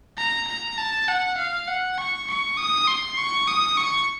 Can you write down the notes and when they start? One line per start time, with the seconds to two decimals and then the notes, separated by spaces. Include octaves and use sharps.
0.18 A#5
0.48 A#5
0.78 A5
1.08 F#5
1.38 F5
1.68 F#5
1.97 C#6
2.28 C#6
2.57 D#6
2.87 C6
3.18 C#6
3.47 D#6
3.77 C#6